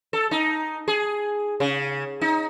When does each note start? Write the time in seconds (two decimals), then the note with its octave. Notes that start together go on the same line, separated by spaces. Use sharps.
0.13 A4
0.31 D#4
0.88 G#4
1.60 C#3
2.21 D#4